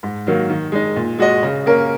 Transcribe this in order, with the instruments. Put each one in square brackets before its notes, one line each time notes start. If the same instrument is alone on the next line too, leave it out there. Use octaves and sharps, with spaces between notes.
[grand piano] G#2
D#3 F#3 A#3
D#3
G#3 D#4
A#2
G#3 F#4 D#5
C#3
A#3 C#4 A#4